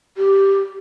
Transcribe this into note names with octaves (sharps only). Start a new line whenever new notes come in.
G4